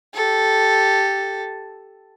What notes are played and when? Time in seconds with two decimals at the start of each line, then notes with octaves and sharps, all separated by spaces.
0.14 G4 A4